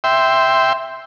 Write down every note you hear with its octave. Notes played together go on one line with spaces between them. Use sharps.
E5 G5 C6